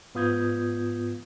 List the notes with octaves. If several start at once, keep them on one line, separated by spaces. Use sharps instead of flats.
G#2 B3 F4 D#6 G6 G#6